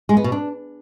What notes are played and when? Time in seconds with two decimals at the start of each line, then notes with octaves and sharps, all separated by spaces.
0.09 G#3
0.17 B3
0.24 B2
0.32 D4